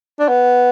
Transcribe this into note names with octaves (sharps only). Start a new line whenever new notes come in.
D4
B3